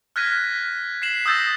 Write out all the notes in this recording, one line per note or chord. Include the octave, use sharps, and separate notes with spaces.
F6 F#6 G#6 A#6 B6 D#7
B6 C7 E7 F#7
D#6 E6 G6 A6 A#6